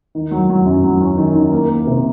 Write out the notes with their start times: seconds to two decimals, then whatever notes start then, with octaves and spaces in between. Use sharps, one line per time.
0.15 D#3
0.31 F#3
0.49 F#3
0.66 F#2
0.84 F#3
1.01 C#4
1.17 D#3
1.35 D#3
1.52 A#3
1.69 A#3
1.87 C3